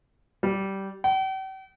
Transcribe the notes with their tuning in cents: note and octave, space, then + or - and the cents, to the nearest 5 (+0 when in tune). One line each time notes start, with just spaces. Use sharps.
G3 -15
G5 -45